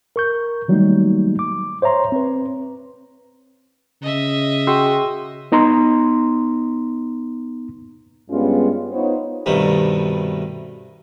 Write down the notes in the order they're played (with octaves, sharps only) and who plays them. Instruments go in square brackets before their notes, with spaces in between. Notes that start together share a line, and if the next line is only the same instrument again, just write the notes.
[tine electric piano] A#4 C#6 G6
D#3 F#3 G3 A3 A#3 D#4
D6
C5 C#5 E5 A#5 C6
C4 B4
[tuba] C#3 [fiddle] D#5 E5
[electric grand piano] F#4 C6 [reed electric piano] G#4 G5 E6
[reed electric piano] B3 D#4 A#5 C6
[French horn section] G2 G3 G#3 B3 C#4 F4
B3 D#4 F4 C5 C#5
[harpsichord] C2 G2 B2 D#3 A3